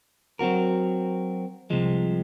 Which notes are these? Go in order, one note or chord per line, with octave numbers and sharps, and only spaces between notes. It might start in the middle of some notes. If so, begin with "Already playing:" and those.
F#3 C4 F#4 A#4
C2 C3 F3 G#3